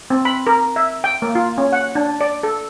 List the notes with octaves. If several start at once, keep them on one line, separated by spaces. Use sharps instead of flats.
C4
B5
A#4
E5
G5
A#3
F4
C#4
F#5
D4
D5
A4